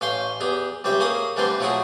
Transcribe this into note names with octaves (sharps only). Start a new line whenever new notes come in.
A1 C#4 F5 G5 C6
E2 G4 G#4
C#2 G3 C4 G4 E5
A#3 C#4 G#4 D6 D#6
D3 E3 G3 A3 C4 C5
F3 F#3 A3 E4 F#4 G#4